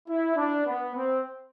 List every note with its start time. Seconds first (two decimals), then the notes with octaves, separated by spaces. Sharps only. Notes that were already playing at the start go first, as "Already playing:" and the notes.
0.08 E4
0.36 D4
0.66 B3
0.95 C4